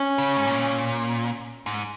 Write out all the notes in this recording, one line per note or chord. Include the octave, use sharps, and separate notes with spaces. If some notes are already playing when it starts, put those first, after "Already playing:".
Already playing: C#4
C#3
G#2
A#2
G#2